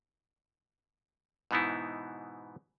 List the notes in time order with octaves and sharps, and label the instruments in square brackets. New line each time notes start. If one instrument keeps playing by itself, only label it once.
[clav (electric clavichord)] G#2 B2 E3 B3 D#4 E4